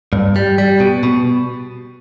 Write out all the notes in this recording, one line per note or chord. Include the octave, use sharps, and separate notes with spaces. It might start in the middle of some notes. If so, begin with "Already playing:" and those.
G2
G3
G3
B2
B2